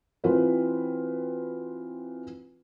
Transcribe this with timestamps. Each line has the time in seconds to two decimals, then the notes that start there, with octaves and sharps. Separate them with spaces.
0.24 E3 C4 F4 F#4 B4 C5